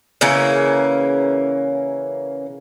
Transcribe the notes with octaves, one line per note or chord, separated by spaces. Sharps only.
C#3 E3 A#3 C#4